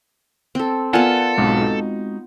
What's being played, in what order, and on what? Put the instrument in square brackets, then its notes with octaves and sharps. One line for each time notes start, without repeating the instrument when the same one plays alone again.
[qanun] C4 A4
[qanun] B3 F4 [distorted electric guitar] A4 [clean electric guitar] A#4 D5 [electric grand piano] F#5 G#5
[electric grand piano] B1 G#2 B2 [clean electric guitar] G#3 C4 F#4
[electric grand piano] D#4